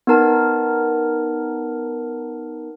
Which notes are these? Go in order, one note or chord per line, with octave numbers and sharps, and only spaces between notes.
B3 D#4 A#4 A5